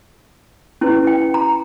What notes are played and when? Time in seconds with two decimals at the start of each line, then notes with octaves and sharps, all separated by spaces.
0.81 C#4 E4 B4
1.07 G5
1.34 A#5